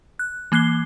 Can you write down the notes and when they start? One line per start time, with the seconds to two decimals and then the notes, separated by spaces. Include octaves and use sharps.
0.19 F#6
0.52 E3 A#3 F#6 C7 G7